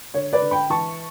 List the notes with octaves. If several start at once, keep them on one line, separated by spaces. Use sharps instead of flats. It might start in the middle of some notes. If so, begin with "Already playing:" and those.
D3 C#5
B4 D5
D3
G5 B5
E3 A5 C#6